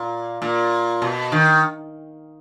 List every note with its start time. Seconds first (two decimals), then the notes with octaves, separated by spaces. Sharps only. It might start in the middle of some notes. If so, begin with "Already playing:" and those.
Already playing: A#2
0.42 A#2
1.02 B2
1.32 D#3